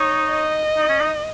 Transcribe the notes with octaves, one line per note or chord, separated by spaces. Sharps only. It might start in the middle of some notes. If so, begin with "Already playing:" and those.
Already playing: D#4 C#5
D#5
D#4
C#4
D#4